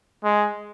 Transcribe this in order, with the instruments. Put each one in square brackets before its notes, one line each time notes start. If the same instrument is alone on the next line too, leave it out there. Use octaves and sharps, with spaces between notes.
[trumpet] G#3